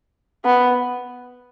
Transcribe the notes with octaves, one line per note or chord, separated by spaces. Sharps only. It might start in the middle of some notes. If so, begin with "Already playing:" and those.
B3